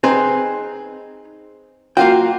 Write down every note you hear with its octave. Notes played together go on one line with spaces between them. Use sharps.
C4 D#4 G#4 B4
A#3 F4 F#4 G5